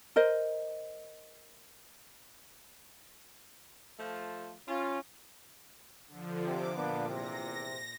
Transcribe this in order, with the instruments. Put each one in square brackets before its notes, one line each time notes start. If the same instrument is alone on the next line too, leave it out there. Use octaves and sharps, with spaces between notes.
[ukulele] A#4 C5 D#5
[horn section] F3 A3 F4
[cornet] C#4 [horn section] F4
[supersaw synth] D3 F3
[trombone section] C3 [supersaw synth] D6
[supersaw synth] A#2 [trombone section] A#3 B3 D4
[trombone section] E2 C3 [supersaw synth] A#6